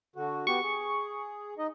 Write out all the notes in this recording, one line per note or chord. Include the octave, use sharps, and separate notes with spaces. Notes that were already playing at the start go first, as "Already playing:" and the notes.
D3 F#4
B3 F#4 G4 C#6
G#4
D#4 D#5